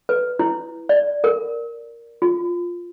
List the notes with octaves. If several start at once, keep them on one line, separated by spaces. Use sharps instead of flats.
B4
E4
D5
A#4
F4